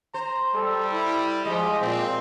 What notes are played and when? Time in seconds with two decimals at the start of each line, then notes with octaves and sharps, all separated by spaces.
0.14 C5 A#5
0.55 G3 A4
0.91 E4
1.45 F3 G#3 G4 D#5
1.81 A#2 C4